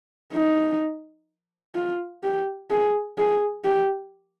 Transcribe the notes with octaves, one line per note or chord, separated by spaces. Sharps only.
D#4
F4
G4
G#4
G#4
G4